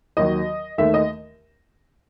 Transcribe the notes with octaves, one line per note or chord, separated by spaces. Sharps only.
D#2 D#3 F#3 D#5
D#2 D#3 A3 E5
D#5